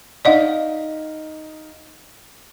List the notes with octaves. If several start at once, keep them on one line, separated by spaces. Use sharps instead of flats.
D#4 D5 D#5 F5 F#5